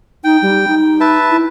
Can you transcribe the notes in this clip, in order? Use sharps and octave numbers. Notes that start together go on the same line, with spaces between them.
D#4 G5
G3
D#4
B4 E5 A5
E4